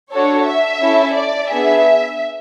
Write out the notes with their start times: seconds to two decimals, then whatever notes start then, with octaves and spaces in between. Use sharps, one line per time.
0.11 D4 F#4 A4 C#5
0.45 E5
0.80 C#4 E4 A4
1.15 D5
1.49 B3 D4 G#4 E5